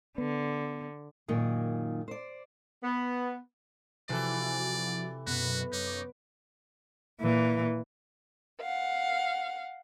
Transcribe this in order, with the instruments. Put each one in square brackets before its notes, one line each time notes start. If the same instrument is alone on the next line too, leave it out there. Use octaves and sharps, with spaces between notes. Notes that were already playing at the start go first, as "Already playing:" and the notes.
[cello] D3 [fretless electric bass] B3
[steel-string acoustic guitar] F#2 A#2 D#3 G#4
C5 D5
[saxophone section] B3
[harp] C3 [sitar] E3 A4 [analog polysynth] F3 E4 F#4 [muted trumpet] D5
[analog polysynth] F#2 B2 [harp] B3 B4 [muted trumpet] F#4
[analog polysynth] F#2 C#5 D6 [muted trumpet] D#4
[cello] A#2 E3
[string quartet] F5 F#5